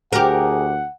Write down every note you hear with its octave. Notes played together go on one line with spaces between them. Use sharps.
D2 G4 G#4 A#4 F#5